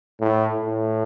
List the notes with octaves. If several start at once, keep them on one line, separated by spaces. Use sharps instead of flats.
A2
A2